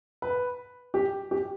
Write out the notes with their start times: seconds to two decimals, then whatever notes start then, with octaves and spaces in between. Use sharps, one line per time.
0.22 B4
0.94 G4
1.31 G4